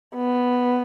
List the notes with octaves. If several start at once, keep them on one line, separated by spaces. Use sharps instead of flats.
B3